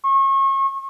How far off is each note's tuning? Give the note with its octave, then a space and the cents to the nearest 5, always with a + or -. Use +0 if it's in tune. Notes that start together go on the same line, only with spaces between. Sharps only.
C#6 -35